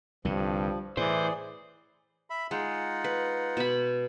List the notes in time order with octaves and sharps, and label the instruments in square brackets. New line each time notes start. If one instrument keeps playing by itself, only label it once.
[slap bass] C2 D3 [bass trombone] G2 [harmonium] F3
[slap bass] A2 [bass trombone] E3 [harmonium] G#4 D5 [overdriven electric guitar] C5
[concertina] E5 B5
[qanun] G#3 [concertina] D#4 F4 F#5
[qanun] B4
B2 B5